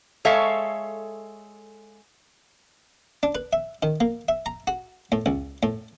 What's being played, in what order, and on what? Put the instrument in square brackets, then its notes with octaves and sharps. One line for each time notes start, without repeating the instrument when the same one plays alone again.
[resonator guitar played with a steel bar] G#3 A4 C#5 E5 F5
[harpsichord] D4
B4
E5
D#3
A#3
E5
A#5
F#4
A2
C#2
A2